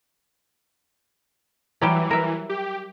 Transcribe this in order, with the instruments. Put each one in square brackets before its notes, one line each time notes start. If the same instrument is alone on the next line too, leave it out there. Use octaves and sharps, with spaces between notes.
[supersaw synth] E3 [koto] F#3 G3 G4
[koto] A#4 E5
[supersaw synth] G4